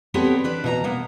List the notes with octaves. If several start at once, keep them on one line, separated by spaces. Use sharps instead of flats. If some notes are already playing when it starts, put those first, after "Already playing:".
B3 C4 G4 A4 C#5 D5
D4 B4 D5
B2 C#5 A#5
A#3 B3